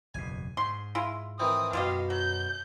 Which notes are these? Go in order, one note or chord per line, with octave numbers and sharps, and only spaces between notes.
F#1 E2 B2 G#5
G#2 C6
G#3 E4 F4
D#3 E3 C4 D#6
F#2 B2 F4 G4 D#5 F5 A5
F#3 G6